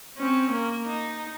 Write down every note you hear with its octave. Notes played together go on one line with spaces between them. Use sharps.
C4 C#4
A#3
D#4